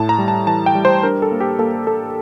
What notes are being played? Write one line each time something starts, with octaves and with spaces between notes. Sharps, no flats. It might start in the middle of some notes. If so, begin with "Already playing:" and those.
Already playing: A2 A5
A#5
G3
A5
E3 A5
G5
G3
C5
D4 A#4
A4
A#3
G4
A#3 A4
A#3 A4